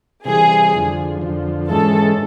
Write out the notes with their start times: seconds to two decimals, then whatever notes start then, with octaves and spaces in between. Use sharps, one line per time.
0.25 C3 E3 G3 G#4
0.73 F2 D3 F3
1.21 F2 D3 F3
1.69 G#2 E3 G#3 C#4 A4